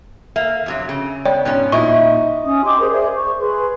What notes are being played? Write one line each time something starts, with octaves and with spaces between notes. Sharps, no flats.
A#3 E5
F2 C3 F#3
C#3
B3 C#5 D5 G5
G#2 B2 C#4
A#2 D#4 E4 D#5 C#6
C#4 D#6
G4 D#5 C6 D6
G#4 A#4 C5 D#6
G#4 C5 D5 E5
C5 C#6
G#4 B4 C6